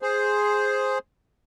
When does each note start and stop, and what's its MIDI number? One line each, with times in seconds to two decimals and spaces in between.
0.02 0.98 68
0.02 0.98 72